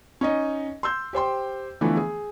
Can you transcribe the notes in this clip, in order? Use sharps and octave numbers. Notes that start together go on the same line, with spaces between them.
C#4 D#4 D#5
C6 E6 G6
G4 C5 G5 C6
D3 E3 F3 A3 B3
G#4